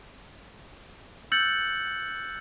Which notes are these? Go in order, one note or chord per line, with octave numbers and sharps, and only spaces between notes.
E6 F#6 G6 A6 C#7 F#7